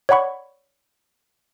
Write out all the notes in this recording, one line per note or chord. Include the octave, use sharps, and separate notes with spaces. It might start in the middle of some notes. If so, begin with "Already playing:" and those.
C#5 D5 F#5 B5 C#6